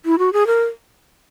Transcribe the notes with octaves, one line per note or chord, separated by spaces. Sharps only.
E4
F#4
G#4
A#4